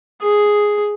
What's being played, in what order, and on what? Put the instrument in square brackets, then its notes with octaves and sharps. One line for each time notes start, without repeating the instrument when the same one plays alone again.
[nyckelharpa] G#4